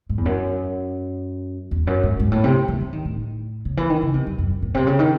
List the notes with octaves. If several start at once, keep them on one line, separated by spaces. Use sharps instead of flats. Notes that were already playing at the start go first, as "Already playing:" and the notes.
G#2
E2
F#2
E2
F#2
G#2
G#2
A2
C3
E3
E3
D#3
A2
C#3
E3
D#3
C#3
C3
F#2
F#2
A2
C3
C#3
D#3